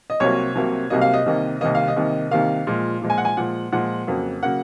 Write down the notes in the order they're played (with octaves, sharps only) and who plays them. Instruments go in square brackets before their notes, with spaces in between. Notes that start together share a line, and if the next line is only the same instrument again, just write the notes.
[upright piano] D#5
C2 C3 F#3 A#3 C#5
C2 C3 F#3 A#3
C2 C3 F#3 A#3 D#5
F5
D#5
C2 C3 D#3 A#3
C2 C3 D#3 A#3 D#5
F5
D#5
C2 C3 D#3 A#3
C2 C3 D#3 A#3 F5
A#2 F3 G#3
A#2 F3 G#3
G#5
F#5
G#5
A#2 F3 G#3 F#5
A#2 F3 G#3 F#5
F2 C#3 F#3 A#3
C#3 F#3 A#3 F#5